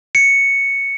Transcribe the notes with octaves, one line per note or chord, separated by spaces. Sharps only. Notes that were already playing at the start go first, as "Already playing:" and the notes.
C#7